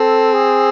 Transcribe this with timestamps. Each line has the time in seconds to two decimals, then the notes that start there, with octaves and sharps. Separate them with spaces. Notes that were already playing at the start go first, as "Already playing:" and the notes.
Already playing: C4 A4
0.33 G#4